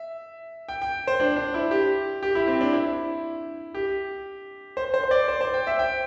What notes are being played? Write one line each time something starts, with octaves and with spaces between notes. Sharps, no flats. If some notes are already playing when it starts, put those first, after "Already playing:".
Already playing: E5
G5
G5
C5
D4
D4
E4
G4
G4
E4
C4
D4
E4
G4
C5
C5
C5
D5
C5
C5
G5
E5
G5